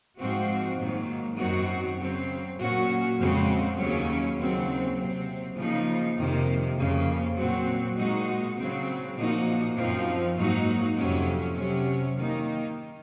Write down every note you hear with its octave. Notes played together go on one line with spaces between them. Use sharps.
G#2 F3 C4 F#4
G#2 D#3 F#3 A#3
F#2 D#3 F#3 C4 F#4
C#3 F#3 C4
A#2 F#3 C#4 F#4
F2 C#3 G#3 C4 F#4
D#2 C#3 F#3 C#4
D#2 C#3 F#3 C4
C3 F#3 C4
C#3 F3 A#3 D#4
F2 C3 D#3 A#3
F2 C#3 F3 A#3
A#2 F#3 C4 F#4
A#2 G#3 D#4 F#4
C#3 F#3 C4
A#2 F3 A#3 D#4 F#4
F#2 F3 C4 D#4
G#2 F#3 A#3 D#4 F#4
F2 C3 F#3 C#4
C3 F#3 C#4
D#3 A#3 D#4